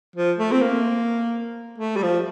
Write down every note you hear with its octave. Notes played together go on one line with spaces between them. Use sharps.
F3
A3
C4
A#3
A3
G3
F3